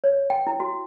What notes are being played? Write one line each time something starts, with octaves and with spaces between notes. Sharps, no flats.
C#5
G5
E4
F#4